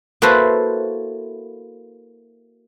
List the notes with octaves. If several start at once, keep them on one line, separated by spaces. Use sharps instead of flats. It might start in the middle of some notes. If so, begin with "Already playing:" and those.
A#3 E4 F#4 A4 B4 C5